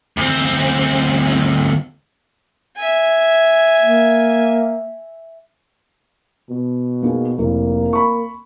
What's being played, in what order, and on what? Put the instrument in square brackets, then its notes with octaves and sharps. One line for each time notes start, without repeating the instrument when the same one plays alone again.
[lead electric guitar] D2 C4
[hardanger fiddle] E5 G#5
[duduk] A#3
[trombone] B2
[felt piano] A#3 D#4 G#4
[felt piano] F1 E4 [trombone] A#3
[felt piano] B5 C#6